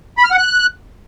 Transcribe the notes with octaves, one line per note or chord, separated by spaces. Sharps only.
B5
F6
F#5
F#6